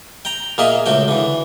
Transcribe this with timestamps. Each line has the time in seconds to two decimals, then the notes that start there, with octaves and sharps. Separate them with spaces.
0.25 G5 A#5
0.58 A#2 A#3 G#4 D#5 E5
0.86 C#2 A3 F#4 G5
1.08 D3 E3